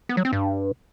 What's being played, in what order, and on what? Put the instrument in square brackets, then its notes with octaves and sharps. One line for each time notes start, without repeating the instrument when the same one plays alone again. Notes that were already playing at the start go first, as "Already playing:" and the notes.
[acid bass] B3
F#3
C4
G2